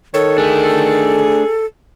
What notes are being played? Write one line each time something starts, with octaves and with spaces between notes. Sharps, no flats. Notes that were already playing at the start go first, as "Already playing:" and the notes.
D#3 A4 C#5
A3 D4 G#4